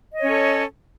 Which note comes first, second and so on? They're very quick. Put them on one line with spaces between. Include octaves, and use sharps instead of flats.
D#5 C#5 C#4 A4